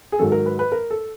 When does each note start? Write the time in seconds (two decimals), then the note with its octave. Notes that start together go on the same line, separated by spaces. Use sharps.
0.12 G#4
0.19 G#2 D#3 F#3 A4
0.32 A#4
0.46 B4
0.59 B4
0.72 A#4
0.90 A4